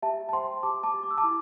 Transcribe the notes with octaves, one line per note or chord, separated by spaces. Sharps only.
G4 E5 A5
A5
C5 G5 C6
G4 A5 D6
A5 D6
G4
D6
E6
A5 D6
E4